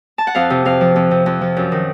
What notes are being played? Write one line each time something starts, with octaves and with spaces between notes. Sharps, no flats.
A5
F#5
F2 F5
C3
F2 F5
F3
F2
C3
F2
F3
F#2
D#3